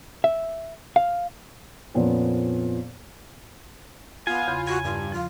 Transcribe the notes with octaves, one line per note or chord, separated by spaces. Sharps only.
E5
F5
F2 A#2 B3 C#4
B3 F4 G#5
E2 C#3 B5
F#4 G#5
G2 F4
F3 F4